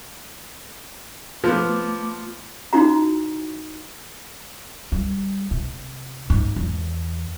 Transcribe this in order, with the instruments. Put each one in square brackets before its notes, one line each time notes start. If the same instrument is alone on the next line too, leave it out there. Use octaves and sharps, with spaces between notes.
[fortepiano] F3 B3 [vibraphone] A3 D6
[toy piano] D#4 E4 F#4 A#5
[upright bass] G3
C3
G#2
E2